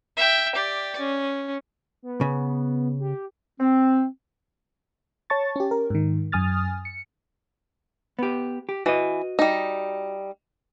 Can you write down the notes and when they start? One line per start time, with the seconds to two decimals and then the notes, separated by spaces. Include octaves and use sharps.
0.17 E5 G5
0.56 G4 D5
0.99 C#4
2.03 B3
2.21 C#3
3.00 G4
3.60 C4
5.30 C#5 A5 C#6 A6
5.56 C#4 G4
5.71 A#4
5.90 G#2 D#3
6.32 F#2 G#5 D#6 F6 A6
6.85 C#7
8.19 B3 G4
8.69 G4
8.86 E3 F#4 D#5
9.39 G3 D#4